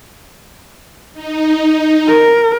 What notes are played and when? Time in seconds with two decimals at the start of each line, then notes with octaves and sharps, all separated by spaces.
1.13 D#4
2.09 A#4